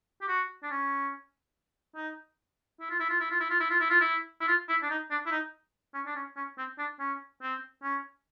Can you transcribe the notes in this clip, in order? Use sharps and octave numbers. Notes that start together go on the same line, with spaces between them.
G4
F#4
D4
C#4
D#4
E4
F4
E4
F4
E4
F4
E4
F4
E4
F4
E4
F4
E4
E4
F4
E4
D4
D#4
D4
E4
D#4
C#4
D4
C#4
C#4
C4
D4
C#4
C4
C#4